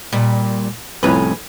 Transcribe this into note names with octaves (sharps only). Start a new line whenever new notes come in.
A#2 G3
C2 F2 A2 C#4 B4